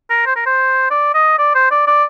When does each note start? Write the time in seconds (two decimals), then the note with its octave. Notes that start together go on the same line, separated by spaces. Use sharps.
0.10 A#4
0.26 C5
0.36 A#4
0.46 C5
0.91 D5
1.14 D#5
1.39 D5
1.55 C5
1.71 D5
1.87 D5